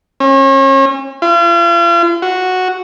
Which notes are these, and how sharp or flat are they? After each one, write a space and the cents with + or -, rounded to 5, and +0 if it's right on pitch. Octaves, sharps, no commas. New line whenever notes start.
C#4 -35
F4 -40
F#4 -5